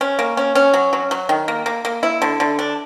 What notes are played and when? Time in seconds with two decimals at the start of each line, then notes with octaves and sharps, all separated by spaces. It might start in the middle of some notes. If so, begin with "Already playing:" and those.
0.01 C#4
0.19 A#3
0.37 C#4
0.55 C#4
0.74 F#3
0.93 F#3
1.11 F#3
1.29 D#3
1.48 A#3
1.66 A#3
1.85 A#3
2.03 E4
2.22 D3
2.40 D3
2.59 D4